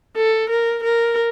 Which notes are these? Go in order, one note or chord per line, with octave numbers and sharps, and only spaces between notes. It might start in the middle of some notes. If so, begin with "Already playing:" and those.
A4
A#4
A#4